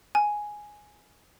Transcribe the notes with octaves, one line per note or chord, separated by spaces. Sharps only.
G#5